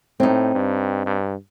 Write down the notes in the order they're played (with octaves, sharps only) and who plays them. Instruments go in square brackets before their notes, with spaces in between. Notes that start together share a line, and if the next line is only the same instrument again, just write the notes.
[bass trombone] A2 [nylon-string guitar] C4 D#4
[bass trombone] G2
G2